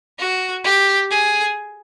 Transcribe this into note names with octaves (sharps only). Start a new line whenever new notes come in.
F#4
G4
G#4